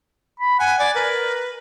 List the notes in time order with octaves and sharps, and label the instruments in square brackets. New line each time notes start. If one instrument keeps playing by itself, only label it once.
[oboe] B5
[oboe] F#5 [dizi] G#5
[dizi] D5 [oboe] G#5
[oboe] A#4 [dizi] B4